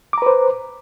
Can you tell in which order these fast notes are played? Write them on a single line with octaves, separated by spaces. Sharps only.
D6 A#5 B4 C5